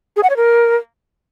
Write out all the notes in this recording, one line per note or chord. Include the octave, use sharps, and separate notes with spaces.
G#4
F#5
C#5
A#4